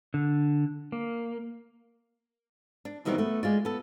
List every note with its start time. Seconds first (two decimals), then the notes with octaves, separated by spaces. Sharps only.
0.14 D3
0.92 A#3
2.85 D4
3.05 B2 D#3 E3 G3 B3 C4
3.18 A3 B3
3.43 G#3 F4 D5
3.65 B3 A4